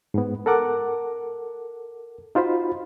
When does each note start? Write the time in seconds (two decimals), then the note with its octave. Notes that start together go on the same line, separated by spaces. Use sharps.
0.14 G#2 B3
0.46 A4 A#4 F#5 D6
2.35 D#4 F4 F#4 C5 B5